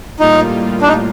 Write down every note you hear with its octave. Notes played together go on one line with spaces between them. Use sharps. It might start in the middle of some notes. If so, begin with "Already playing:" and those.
A2 G3 A#3 D#4 F4
D4
D#4